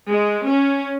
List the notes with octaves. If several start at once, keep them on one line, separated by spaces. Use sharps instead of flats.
G#3
C#4